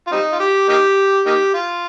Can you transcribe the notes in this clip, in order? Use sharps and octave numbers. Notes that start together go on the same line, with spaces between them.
F4
G3 C4 D#4
F4
G4
A#3 D#4 G4
A#3 D#4 G4
F4